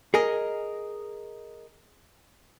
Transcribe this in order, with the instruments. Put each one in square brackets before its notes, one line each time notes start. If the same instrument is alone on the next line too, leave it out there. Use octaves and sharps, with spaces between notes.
[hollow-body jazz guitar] G#4 A#4 D#5